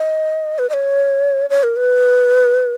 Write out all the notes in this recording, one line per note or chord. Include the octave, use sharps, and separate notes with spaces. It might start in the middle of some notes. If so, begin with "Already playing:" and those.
Already playing: D#5
B4
D#5
C#5
C#5
A#4
B4